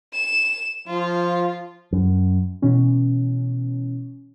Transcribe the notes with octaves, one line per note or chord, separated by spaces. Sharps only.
E7
F3 F4
F#2
B2 E3 C#4